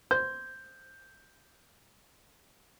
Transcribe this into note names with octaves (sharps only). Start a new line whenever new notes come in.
C5 G6